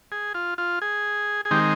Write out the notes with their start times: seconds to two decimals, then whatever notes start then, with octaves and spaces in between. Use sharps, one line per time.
0.12 G#4
0.34 F4
0.58 F4
0.82 G#4
1.45 G#4
1.51 D#3 G#3 C4 D#4 G4